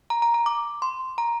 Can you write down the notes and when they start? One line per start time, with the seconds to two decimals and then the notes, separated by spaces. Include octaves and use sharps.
0.10 A#5
0.22 A#5
0.34 A#5
0.46 D6
0.82 C6
1.18 A#5